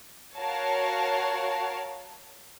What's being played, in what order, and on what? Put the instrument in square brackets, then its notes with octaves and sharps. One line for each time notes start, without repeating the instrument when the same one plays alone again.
[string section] F#4 A#4 C#5 F5 A5